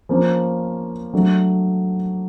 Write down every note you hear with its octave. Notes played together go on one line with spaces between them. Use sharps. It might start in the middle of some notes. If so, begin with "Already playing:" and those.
F3 A#3 C#4
F#3 A3 D4